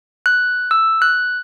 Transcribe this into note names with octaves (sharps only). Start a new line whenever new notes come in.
F#6
E6
F#6